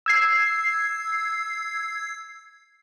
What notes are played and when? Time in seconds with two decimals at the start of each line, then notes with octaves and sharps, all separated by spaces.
0.06 E6 G#6 C7